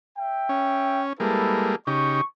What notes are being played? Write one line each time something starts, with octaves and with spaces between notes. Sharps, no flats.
E5 G5
C#4
G3 G#3 A#3 E4 A4 B4
C#3 D#4 G4 C#6